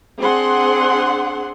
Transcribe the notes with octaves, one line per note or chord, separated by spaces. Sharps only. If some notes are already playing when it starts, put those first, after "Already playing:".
C4 D4 G#4 F#5 C6